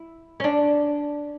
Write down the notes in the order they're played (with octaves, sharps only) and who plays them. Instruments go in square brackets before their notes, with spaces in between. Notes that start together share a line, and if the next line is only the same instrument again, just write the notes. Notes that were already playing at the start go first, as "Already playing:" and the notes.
Already playing: [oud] E4
C#4
D4